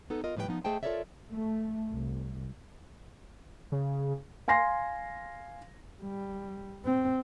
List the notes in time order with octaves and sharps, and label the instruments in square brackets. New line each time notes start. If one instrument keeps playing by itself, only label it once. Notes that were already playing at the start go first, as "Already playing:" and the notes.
[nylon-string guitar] B3 D#4 A4
F4 A#4 D#5
A2 F3 G3 B4 C5 G5
F3 B3 D#4
A3 G#4 C5 D#5 G5 A5
F4 A4 A#4 C#5 D5 E5
[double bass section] A3
C2
[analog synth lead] C#3
[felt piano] F5 G#5 C6 A#6 C7
[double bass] G3
C4